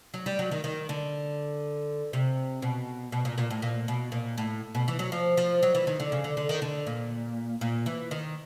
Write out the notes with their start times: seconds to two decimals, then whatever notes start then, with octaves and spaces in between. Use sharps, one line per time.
0.14 F#3
0.26 G3
0.39 F#3
0.51 D#3
0.64 D#3
0.89 D3
2.13 C3
2.62 B2
3.12 B2
3.25 A#2
3.38 A#2
3.50 A2
3.62 A#2
3.88 B2
4.12 A#2
4.38 A2
4.75 B2
4.88 E3
4.99 F#3
5.12 F3
5.37 F3
5.63 F#3
5.75 E3
5.87 D#3
6.00 D3
6.12 C#3
6.24 D3
6.37 D3
6.49 D#3
6.62 D3
6.87 A#2
7.61 A#2
7.86 E3
8.11 D#3